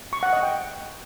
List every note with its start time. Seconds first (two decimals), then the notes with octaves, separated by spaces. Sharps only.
0.13 C#6
0.23 F#5
0.33 D#5
0.43 G5